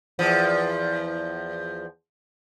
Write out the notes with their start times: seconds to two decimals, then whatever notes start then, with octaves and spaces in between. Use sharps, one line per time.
0.19 E2 F3